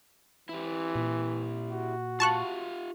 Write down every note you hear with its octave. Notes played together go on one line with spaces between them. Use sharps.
E3 E4 G4
A#2
F#4
F4 G4 F5 A5 C#6 F#6